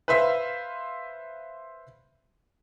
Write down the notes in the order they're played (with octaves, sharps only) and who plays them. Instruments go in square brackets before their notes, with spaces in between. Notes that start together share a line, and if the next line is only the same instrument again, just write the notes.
[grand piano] B4 C5 E5 F5